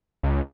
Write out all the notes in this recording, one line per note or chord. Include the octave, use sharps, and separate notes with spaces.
C#2